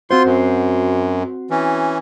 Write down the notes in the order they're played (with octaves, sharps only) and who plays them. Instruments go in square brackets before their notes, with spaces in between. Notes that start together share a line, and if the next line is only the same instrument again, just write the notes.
[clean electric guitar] C4 F#4 C5 [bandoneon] F4 C6
[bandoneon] F#2
E3 C#4